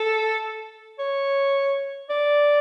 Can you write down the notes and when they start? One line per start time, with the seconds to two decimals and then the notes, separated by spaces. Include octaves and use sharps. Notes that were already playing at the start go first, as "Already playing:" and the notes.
Already playing: A4
0.99 C#5
2.09 D5